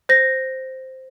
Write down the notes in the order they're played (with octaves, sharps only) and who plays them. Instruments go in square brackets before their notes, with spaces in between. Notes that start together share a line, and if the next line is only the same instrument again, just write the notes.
[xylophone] C5 A#6